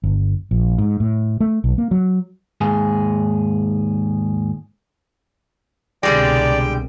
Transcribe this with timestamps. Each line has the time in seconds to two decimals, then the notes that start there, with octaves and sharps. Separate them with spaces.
0.03 G1
0.51 A#1
0.78 G#2
1.00 A2
1.40 A3
1.64 B1
1.78 A#3
1.91 F#3
2.61 D#2 G#2 G#4
6.03 C2 B2 D3 G3 G#3 D5 G5